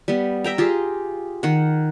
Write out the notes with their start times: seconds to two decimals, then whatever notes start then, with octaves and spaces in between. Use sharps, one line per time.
0.08 G3 B3
0.44 E5 G5 A#5
0.58 F4 G4 G#4
1.43 D#3 F#5